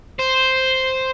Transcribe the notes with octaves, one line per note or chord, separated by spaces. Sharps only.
C5